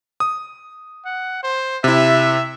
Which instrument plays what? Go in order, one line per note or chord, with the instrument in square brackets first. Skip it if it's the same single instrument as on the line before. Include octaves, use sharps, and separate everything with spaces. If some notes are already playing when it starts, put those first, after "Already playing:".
[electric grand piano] D#6
[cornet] F#5
C5
[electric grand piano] C3 E4 [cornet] E5